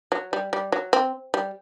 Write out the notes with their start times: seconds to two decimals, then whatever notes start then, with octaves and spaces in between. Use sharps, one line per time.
0.12 F#3
0.33 G3
0.53 G3
0.72 F#3
0.93 C4
1.34 G3